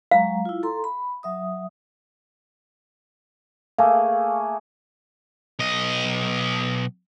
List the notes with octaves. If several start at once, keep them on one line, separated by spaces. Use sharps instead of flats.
F#3 G#3 F5 A#5
E4 F4
A4 A#5 C6
B5
F#3 E5 D#6
A3 A#3 G#4 F5
B1 D#5